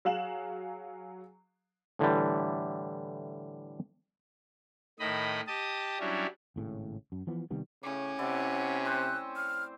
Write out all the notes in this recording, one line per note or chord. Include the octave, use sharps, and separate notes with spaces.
F#3 G#4 F5 F#6 E7 F#7
A2 D3 E3 G3
A2 D#3 D#5 B5
G4 D#5 A5 D#6
F#3 G3 C#4 D4 E4
G#1 A2 C#3
F#2
E3 F3 B3
C3 D#3 G3 B3
A2 C#3 C#4 D6
C3 E4 D5 F#5
C4 C5 F#6
F6